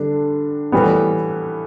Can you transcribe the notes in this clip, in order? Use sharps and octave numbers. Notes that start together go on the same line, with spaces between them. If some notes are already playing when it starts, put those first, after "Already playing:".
Already playing: D3 G3 D4
A2 E3 G3 B3